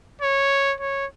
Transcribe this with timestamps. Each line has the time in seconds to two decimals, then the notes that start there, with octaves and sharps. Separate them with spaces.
0.22 C#5
0.81 C#5